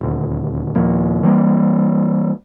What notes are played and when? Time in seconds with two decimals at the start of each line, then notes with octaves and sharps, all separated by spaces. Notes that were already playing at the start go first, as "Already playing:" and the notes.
0.01 D#1 D2
0.76 D#2 A#2 F3 A#3
1.23 E3 G3 A#3